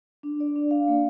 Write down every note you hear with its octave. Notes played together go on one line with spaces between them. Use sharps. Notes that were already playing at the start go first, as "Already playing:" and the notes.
D4
D5
D4
F5
A#3